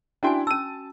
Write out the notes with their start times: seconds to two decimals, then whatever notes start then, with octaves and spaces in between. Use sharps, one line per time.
0.23 C#4 D4 E4 F#4 G5 G#5
0.47 C#4 A5 E6 D#7